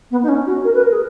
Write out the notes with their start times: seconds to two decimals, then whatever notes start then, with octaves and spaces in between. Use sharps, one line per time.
0.11 B3
0.23 D#4
0.29 C#4
0.47 F#4
0.65 A#4
0.74 B4
0.83 A#4
0.92 G#4